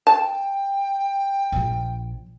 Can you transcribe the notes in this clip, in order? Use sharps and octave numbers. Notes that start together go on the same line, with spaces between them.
G5 A5
A#1 F3